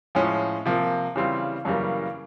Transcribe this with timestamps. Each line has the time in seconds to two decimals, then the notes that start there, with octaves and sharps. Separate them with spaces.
0.15 A2 F3 G#3 C#4
0.66 C3 F3 A#3
1.16 C#3 E3 G3 C4 F4
1.65 F#2 C#3 E3 G3 A#3